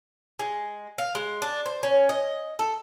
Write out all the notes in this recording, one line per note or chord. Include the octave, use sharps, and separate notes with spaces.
G#3
F5
G#3
D4
C5
C#4
D#5
A4